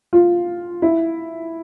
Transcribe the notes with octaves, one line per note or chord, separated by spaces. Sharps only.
F4
E4